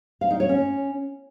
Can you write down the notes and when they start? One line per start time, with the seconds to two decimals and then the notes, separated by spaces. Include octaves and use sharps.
0.21 F5
0.31 D#4
0.40 C#5
0.49 C#4